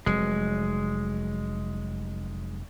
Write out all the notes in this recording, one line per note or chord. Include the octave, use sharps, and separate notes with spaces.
F1 F#3 G#3